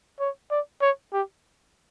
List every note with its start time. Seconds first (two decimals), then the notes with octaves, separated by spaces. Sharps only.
0.20 C#5
0.51 D5
0.81 C#5
1.13 G4